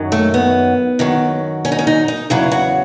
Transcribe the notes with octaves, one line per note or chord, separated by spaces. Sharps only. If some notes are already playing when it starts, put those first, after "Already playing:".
Already playing: F#2 D#3 F#3
A3
B3
F#2 D#3 F#3
C#4
D#4
C#4
D#4
D#4
E2 C#3 F#3 E4
F#4